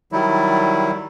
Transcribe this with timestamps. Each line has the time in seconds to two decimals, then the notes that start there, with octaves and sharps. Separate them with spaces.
0.12 D#3 F#3 G3 E4